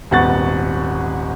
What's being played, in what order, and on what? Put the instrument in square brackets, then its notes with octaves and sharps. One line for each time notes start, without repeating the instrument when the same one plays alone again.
[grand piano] D#1 G#1 B3 F#5 C#6 A6